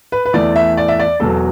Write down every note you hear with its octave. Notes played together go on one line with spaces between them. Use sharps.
B4
B4
E2 E3 A3 D5
E5
D5
E5
D5
E1 E2 B2 F#3 A4